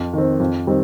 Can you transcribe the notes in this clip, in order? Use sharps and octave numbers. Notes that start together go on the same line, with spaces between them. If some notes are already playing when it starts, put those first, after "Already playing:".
Already playing: F2
D#3 C4
F2
D#3 G3 C4